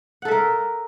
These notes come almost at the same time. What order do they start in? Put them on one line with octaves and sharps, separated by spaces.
F#5 A4 E5 A#4